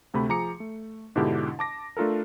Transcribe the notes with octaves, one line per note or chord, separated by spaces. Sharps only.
D2 C3 A3 B5
F3 G#4 A#5 D6 C#7
A3
G#2 B2 D3 D4 E4 G4
A5 D6 A#6
A3 D4 F4 A4 A#4